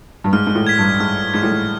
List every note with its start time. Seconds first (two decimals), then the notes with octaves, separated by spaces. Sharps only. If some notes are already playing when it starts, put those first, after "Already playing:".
0.24 G2
0.33 G#2 F6
0.47 G#2
0.55 A2
0.67 G#6 B6
0.79 G2
1.00 G#2 F6
1.34 G#2 G#6
1.39 A2 B6
1.51 G#2